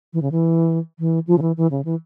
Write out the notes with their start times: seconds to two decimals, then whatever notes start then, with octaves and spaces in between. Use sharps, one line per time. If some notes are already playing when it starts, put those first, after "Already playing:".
0.13 E3
0.22 C#3
0.32 E3
0.99 E3
1.27 F3
1.38 C#3
1.42 E3
1.57 E3
1.71 C#3
1.85 E3